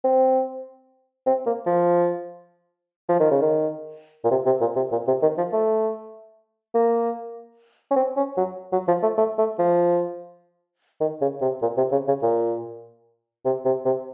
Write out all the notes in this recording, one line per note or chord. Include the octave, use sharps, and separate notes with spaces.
C4
C4
A#3
F3
F3
D#3
C#3
D#3
A#2
C3
C3
A#2
C3
A#2
C3
D#3
F3
A3
A#3
C#4
C4
C#4
F#3
F#3
F3
A3
A3
A3
F3
D#3
C#3
C3
A#2
C3
C#3
C#3
A#2
C3
C3
C3